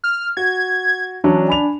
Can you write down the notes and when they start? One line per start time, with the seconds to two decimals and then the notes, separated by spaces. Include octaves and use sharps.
0.04 F6
0.37 F#4 G#6
1.24 E3 F#3 C#4 D4
1.48 G#5 B5 F7